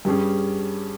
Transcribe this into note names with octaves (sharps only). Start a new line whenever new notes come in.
G2 G3 C#4 G#4